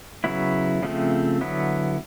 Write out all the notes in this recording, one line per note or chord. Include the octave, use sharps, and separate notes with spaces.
C#3 F#3 B3 E4
C#3 F3 A3 C4
D3 F#3 B3 E4